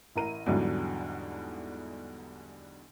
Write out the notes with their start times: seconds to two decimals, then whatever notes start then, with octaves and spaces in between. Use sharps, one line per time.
0.16 A1 E4 A#4 A#5 D#7
0.46 E2 G#2 D3 E3 F#3 G3